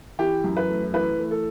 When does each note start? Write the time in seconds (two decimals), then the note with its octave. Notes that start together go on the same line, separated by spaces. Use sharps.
0.19 E3 G4
0.44 F#2
0.57 B4
0.69 A3
0.93 E3 B4
1.18 A3
1.31 A4